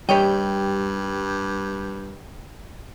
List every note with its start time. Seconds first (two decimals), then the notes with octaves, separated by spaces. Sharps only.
0.09 G2 G3 G4 C#5 D#5 G5